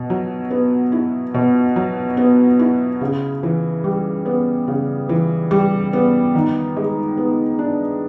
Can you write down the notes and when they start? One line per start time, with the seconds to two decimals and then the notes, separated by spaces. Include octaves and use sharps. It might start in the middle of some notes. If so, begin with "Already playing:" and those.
Already playing: B2
0.10 F#3
0.51 B3
0.92 E4
1.34 B2
1.76 F#3
2.17 B3
2.59 E4
3.01 C#3
3.43 E3
3.84 G3
4.26 B3
4.68 C#3
5.09 E3
5.51 G3
5.93 B3
6.35 D#3
6.76 G#3
7.17 B3
7.59 D4